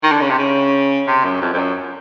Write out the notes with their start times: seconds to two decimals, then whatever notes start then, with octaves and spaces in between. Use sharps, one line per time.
0.03 D#3
0.12 D3
0.21 C#3
0.30 C3
0.38 C#3
1.08 C3
1.24 F#2
1.42 F2
1.54 F2
1.58 F#2